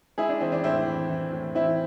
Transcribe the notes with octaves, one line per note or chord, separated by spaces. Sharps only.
G#3 E4 G#4
D4
E3 C4
D4
A2 C4 E4
E3
E3
A2
E3 C4 E4